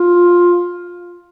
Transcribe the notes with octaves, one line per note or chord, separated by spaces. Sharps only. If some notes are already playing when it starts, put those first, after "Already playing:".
Already playing: F4